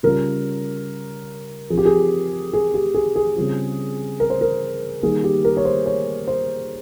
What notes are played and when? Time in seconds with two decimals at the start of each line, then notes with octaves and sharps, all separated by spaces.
0.03 C#3 G3 C#4 F4 A#4
1.70 F3 C4 F4 G#4
1.78 G4
1.85 G#4
2.53 G#4
2.74 G4
2.94 G#4
3.16 G#4
3.36 C#3 G3 C4 F4
4.20 A#4
4.30 C5
4.41 A#4
5.02 D#3 G3 A#3 D#4 G#4
5.24 G4
5.45 A#4
5.57 C#5
5.65 C5
5.86 C#5
6.28 C5